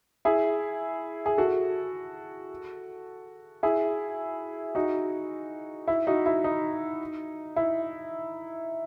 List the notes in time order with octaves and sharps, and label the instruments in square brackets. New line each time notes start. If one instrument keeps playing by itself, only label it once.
[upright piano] E4 G#4
G#4
F#4 A4
E4 G#4
D#4 F#4
E4
D#4 F#4
E4
D#4
E4